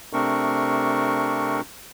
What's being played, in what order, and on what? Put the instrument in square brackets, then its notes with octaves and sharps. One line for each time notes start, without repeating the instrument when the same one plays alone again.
[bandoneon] C3 A3 C4 D4 A#4 C#6